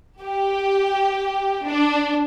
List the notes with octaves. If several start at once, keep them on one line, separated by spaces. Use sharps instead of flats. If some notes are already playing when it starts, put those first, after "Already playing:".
G4
D4